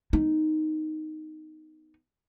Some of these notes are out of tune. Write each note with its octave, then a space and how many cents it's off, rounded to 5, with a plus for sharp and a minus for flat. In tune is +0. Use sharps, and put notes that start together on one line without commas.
B3 +20 D#4 +0